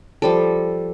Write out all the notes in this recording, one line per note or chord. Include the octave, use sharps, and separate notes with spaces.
F3 G3 A4